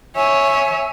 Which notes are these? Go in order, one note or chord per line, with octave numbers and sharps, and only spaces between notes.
C#5 E5 G#5